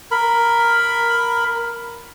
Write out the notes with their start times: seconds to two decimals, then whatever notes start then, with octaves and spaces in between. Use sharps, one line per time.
0.11 A#4 B5